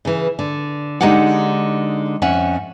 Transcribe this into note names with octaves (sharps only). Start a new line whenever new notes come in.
C#3 E3
D3
D3 G#3 D#4 F4 G4 F#5
F2 C#4 E5 F#5